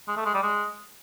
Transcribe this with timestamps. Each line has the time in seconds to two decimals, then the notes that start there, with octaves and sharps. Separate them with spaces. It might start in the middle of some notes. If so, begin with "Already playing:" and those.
0.08 G#3
0.17 A3
0.26 G#3
0.34 G3
0.43 G#3